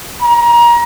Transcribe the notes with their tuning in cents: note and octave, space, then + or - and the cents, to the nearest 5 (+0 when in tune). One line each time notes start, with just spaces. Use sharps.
A#5 +25